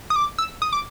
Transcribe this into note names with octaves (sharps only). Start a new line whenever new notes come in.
D#6
D6
E6
D#6
D6